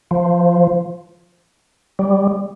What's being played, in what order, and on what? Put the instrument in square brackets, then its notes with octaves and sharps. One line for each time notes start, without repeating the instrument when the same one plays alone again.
[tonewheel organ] F3
G3